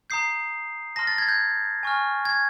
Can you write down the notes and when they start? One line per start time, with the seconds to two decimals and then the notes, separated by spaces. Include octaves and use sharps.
0.10 A#5 D#6 G6 C7
0.96 A5 C6 F6 A#6
1.07 A6
1.18 G#6
1.28 G6
1.83 G#5 C#6 F6
2.25 G#6